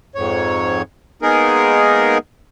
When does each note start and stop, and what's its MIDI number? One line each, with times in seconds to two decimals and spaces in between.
0.15 0.82 41
0.15 0.82 44
0.15 0.82 73
1.22 2.18 56
1.22 2.18 58
1.22 2.18 59
1.22 2.18 63
1.22 2.18 68
1.22 2.18 70